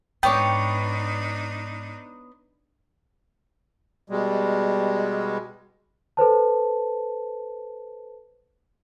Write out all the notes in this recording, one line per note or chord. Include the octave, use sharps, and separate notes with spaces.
G#2 B3 D4 D#4 C#5 G5 D6
B2 G3 G#3
A4 B4 C5 A5